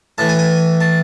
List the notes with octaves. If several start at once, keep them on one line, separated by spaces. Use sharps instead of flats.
A2 E3 A5
G#5
G#5
A5